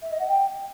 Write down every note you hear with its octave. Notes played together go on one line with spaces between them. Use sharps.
E5
D#5
F#5
G5